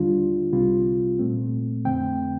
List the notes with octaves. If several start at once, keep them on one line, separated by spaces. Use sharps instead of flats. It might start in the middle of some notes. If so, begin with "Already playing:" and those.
Already playing: D#2 D3 G3 D4 F4
C2 C3 G3 C4 F4
A#2 A3 C4
F2 D3 A3 C4 G5